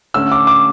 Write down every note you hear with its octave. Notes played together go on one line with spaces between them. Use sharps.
D3 A3 C#4 E6
D6
D6